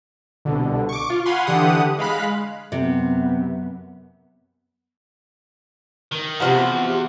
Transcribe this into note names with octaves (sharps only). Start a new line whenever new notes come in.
C2 B2 D3
C#6 D6
F4
F5 F#5 G#5 B5 C6
D3 E3 G4 F#5 D#6
G#3 F5 B5 F#6
F#2 C3 B3
D#3
E2 C3 F3 F#4